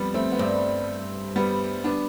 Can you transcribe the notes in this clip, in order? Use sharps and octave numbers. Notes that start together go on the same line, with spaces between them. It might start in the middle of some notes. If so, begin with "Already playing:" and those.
Already playing: F2 G3 B3
A3 C4
B3
G2 A3 C4
G3 B3
B3 D4